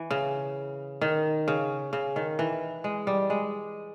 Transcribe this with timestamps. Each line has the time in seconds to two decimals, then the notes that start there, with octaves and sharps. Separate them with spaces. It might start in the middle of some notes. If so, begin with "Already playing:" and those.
Already playing: E3
0.11 C#3
1.01 D#3
1.48 C#3
1.93 C#3
2.16 D#3
2.39 E3
2.84 G#3
3.07 G3
3.30 G#3